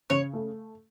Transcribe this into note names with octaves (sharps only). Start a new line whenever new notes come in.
C#3 C#5
A3